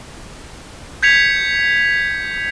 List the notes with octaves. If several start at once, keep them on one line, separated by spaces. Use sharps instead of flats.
G6 G#6 B6 C#7 F7